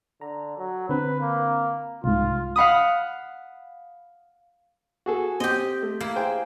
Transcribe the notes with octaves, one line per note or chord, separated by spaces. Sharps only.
D3 A#5
F#3
D3 C4 B4
A#3
C2 G#2 F4
F5 F#5 B5 D#6
F#4 G#4 A4
C4 G4 D#5
A3
A#3 E4
G#4 C5 G5